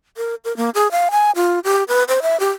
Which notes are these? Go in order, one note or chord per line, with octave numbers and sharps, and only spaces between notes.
A#4
A#4
A#3
G#4
F5
G#5
F4
G4
B4
C5
E5
G4